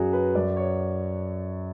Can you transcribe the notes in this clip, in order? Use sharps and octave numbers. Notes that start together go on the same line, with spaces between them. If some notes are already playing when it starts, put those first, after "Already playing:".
Already playing: F#2 F#3 F#4 G#4
B4
F#2 D5
C#5